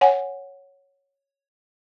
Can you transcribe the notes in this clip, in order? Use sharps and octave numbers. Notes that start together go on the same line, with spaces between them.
C#5 F#5 G#5